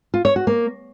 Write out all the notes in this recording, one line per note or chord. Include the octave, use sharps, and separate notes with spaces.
F4
C#5
F#4
A#3